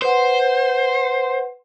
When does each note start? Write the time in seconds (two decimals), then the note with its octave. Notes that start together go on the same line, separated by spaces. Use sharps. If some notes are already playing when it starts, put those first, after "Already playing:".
0.02 B4 C5 F#5